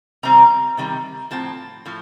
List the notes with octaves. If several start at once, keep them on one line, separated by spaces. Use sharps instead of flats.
C3 D#3 G3 C4 A#5
C3 D#3 G3 C4
A2 F3 C4 A5
A2 F3